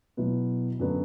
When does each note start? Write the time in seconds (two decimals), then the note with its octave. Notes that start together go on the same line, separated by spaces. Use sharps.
0.17 B2 F#3 B3 E4
0.79 F#2 D3 F#3 B3 D4